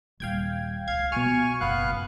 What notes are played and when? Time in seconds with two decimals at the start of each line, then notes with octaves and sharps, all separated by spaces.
0.20 D#1 G3 F5 G5 G#6
0.88 C#2 F5 G#6
1.12 B2 F4 G#5 C#6 F6
1.61 F#1 B3 F4 F5 F#6
1.88 F#2 A2